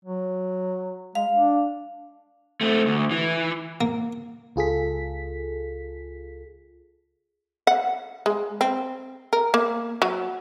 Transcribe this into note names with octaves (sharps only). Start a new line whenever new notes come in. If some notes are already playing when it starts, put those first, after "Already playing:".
F#3
G#3 F5
D4
A3 C4
D2
E3
A#3
C#2 F4 G#4 A4 B6
F#5
G#3
C4
A#4
A#3
F#3